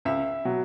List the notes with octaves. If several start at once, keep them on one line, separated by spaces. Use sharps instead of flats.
C#2 E5
B2 F#3